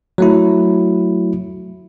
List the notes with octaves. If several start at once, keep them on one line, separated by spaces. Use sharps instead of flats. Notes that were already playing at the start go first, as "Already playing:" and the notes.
F#3 A3 E4